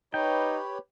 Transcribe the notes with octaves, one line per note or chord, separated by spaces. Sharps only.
D#4 G4 B4 C#5 G5